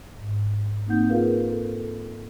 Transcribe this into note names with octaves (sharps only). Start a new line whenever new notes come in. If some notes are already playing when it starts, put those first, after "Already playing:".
G#2
A#3 C4 D#4 F#5 G6
F4 G#4 A#4 B4 F5
A4